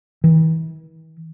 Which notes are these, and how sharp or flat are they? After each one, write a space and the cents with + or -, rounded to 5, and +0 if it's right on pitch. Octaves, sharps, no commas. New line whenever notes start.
E3 -40